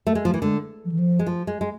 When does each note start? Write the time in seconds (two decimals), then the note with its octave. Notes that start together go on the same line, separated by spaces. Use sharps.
0.07 A3
0.15 G#3
0.25 F3
0.34 E3
0.42 D3 G#3
0.85 F3
0.92 E3
0.99 F3
1.19 G#3
1.27 F3
1.47 G#3
1.61 G#3